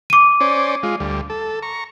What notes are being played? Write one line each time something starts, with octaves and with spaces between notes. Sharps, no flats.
D6 D#7
C#4 C5 D5
G#3 F4
D2 G3
A4
A#5 C#6